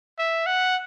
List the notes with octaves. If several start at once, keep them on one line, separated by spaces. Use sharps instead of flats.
E5
F#5